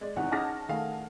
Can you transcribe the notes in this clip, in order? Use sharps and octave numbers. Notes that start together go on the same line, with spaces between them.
G#3 D5
E2 C3 D#3 C#5 F#5
C#4 D#4 G#4 A5 D6 F6 A#6
D#3 A3 G#4 F5